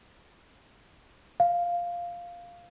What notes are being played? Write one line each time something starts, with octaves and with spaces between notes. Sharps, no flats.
F5